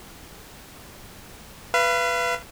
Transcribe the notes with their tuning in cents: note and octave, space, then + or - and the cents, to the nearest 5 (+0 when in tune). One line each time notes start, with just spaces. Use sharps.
B4 +0 F5 -40